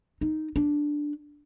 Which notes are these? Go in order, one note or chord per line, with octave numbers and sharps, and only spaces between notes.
D#4
D4